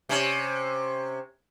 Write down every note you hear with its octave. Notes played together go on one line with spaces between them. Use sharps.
C3 C#4